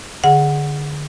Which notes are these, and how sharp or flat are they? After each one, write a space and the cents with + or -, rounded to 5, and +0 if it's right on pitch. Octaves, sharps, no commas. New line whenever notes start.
D3 +0 G#4 +0 F#5 -5